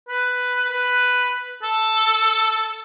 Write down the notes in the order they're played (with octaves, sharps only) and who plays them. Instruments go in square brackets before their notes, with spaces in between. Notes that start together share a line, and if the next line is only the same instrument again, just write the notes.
[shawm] B4
B4
A4